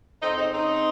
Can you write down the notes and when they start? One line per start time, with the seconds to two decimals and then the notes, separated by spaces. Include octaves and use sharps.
0.21 F2 C4 D#4
0.37 C#3 C4 D#4
0.53 C#3 C4 D#4